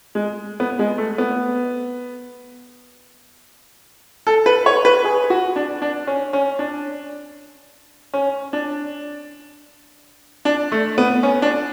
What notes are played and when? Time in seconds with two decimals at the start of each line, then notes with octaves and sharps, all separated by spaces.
0.15 G#3
0.60 B3
0.79 G#3
0.98 A3
1.18 B3
4.27 A4
4.46 B4
4.66 C#5
4.85 B4
5.05 G#4
5.30 F#4
5.56 D4
5.82 D4
6.07 C#4
6.33 C#4
6.59 D4
8.14 C#4
8.53 D4
10.45 D4
10.72 A3
10.98 B3
11.23 C#4
11.42 D4